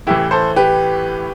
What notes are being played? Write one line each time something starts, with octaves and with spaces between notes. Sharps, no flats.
A1 A2 E3 E4 G4
A4 C5
G4 B4